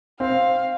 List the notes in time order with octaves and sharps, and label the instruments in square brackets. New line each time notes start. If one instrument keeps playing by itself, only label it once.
[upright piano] C4 [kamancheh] F5